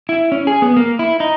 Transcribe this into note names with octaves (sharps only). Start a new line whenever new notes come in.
E4
C#4
G#4
B3
A#3
E4
D#4